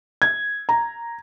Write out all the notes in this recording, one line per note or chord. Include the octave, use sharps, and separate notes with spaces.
G#6
A#5